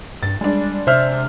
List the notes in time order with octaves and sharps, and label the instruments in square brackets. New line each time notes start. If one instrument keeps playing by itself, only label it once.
[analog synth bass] G2 [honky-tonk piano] A6
[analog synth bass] G3 [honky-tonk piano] G#3 D4
[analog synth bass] C3 [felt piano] C5 E5 F6